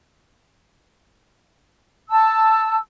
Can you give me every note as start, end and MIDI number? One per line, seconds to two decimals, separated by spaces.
2.10 2.77 81
2.10 2.77 88